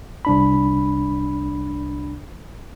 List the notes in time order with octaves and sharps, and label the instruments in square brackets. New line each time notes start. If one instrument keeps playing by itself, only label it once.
[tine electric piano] C2 D4 B5